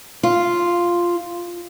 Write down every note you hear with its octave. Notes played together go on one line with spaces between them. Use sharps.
F4